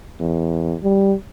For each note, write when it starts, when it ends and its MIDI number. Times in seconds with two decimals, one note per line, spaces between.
0.20 0.76 40
0.83 1.13 55